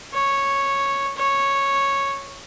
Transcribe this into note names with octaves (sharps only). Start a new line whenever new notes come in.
C#5
C#5